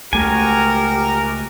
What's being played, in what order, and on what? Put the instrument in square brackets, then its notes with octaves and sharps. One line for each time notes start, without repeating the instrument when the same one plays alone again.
[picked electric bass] C#2 A3 [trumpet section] F#4 A#4 [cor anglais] G4 [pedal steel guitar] G#5